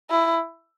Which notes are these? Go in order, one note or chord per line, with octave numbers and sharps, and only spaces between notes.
E4